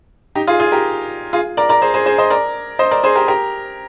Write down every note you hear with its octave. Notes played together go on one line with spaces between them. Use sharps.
D#4 G4
F4 G#4
F4 G#4
G4 A#4
F4 G#4
A#4 D5
A#4 D5
G#4 C5
G#4 C5
G#4 C5
C5 D#5
A#4 D5
C5 D#5
A#4 D5
G#4 C5
G4 A#4
G4 A#4